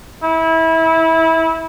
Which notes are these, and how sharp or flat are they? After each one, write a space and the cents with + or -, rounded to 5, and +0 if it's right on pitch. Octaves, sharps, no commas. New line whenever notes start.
E4 -25